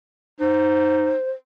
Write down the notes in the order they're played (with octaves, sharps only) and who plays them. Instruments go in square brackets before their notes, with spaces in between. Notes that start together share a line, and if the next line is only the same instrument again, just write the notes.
[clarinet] D#4 [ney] C5